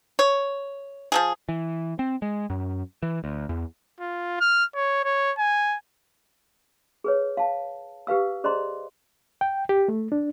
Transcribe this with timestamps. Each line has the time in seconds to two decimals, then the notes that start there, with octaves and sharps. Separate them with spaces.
0.19 C#5
1.12 F3 F#3 G#4
1.49 E3
1.99 C4
2.22 G#3
2.50 F#2
3.03 E3
3.24 D2
3.49 E2
4.00 F4
4.41 F6
4.74 C#5
5.05 C#5
5.38 G#5
7.04 G#4 B4 C#5
7.37 F5 A5
8.07 G4 B4 F5 E6
8.44 G#4 C5 D5 D#5 A#5 C6
9.41 G5
9.69 G4
9.88 A3
10.12 D4